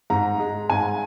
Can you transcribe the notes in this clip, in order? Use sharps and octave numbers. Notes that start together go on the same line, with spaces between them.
G#2 A#5
G#3
G#2 G#5